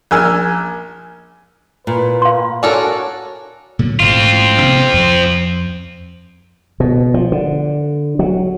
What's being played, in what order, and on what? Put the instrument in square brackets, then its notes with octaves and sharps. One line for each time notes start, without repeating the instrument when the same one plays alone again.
[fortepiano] A#1 A#3 G#5 E6 F6
[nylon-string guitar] A#2 [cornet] B4
[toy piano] F5 C6
[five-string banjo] D4 A4 A#4 [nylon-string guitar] F#4 G#5 [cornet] C#5
[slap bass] A#2 D3 F#3
[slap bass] A1 G#2 [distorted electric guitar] C4 F4
[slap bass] C3 B3
F2
B2
F3
D3
F#3